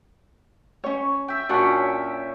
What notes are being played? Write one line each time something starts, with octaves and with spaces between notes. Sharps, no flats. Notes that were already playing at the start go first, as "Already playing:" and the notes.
C#4 C#5
E5 G5
A#2 C#4 D4 F#4